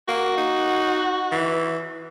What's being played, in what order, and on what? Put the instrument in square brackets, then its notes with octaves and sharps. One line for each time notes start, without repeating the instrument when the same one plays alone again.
[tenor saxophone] A#3 [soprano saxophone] F#4
[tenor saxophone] D#4
E3